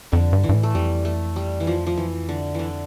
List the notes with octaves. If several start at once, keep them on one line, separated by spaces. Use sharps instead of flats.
F2 D3
G2
E3
G2
A2
A3
F2 G3
A3
G3
E3
F3
F3
E2
F2 E3
D3
D3 E3